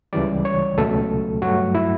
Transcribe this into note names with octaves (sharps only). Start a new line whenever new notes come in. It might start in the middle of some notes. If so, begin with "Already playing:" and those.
C#2 C#3 E3 G3 D5
C#5
C#2 B2 F#3 A3 A4
G2 F#3 A3 F#4
E4